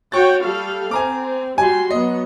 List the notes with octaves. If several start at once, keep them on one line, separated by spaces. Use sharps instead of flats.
F#4 C#5 G5 C#6 A6
G3 A4 F5
C4 G#5 A#5 D6
G3 F#4 G#5 C6
F#3 B3 D#5